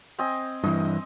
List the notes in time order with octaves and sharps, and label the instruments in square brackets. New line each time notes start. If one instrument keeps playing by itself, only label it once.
[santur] C4 D#5 G#5
[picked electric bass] G2 E3 [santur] D#5